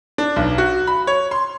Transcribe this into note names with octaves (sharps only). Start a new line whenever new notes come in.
D4
B1
F#4
B5
C#5
C6